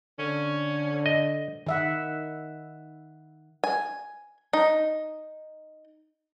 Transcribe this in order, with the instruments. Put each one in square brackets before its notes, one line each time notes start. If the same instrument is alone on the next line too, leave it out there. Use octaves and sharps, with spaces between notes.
[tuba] D3 [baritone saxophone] C#4
[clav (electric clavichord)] D#5
[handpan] D#3 E5 F#5
[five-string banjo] G#5
D#4